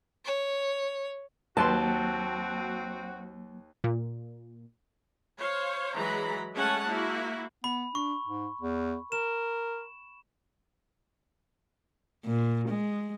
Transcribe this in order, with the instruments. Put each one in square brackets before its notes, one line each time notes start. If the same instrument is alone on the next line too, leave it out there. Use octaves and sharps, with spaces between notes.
[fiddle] C#5
[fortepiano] D#2 B4 C6 [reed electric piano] F#3 A#3 [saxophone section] C4 F#4 [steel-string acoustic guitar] A5
[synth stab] A#2
[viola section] C5 C#5 F5
E3 F#3 G#3 A#5 B5
G#3 A3 C#4 C#5 F#5 A5
A#3 E4 F#4
[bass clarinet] B3 [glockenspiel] B5
[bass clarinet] D4 [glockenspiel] C#6
[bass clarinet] G#2
E2
[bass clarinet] A#4 [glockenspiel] E7
[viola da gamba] A#2
G#3